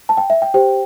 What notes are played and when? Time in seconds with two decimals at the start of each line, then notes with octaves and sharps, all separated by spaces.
0.09 A5
0.17 G5
0.30 E5
0.42 G5
0.54 G4 C5 G5